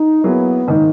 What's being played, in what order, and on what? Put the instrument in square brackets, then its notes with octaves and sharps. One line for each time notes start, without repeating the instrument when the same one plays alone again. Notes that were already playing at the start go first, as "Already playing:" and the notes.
Already playing: [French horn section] D#4
[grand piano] F#3 A#3 E4 G#4 [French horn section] B3
[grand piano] G#2 D#3 A#3 D#4